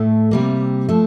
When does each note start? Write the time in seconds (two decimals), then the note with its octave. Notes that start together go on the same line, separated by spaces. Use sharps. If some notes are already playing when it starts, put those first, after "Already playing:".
Already playing: A2 A3
0.31 C3 G3 A#3
0.89 F3 A3